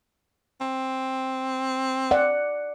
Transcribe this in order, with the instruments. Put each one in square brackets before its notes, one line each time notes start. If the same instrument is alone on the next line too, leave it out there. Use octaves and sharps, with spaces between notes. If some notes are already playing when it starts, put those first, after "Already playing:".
[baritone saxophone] C4
[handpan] D5 F#5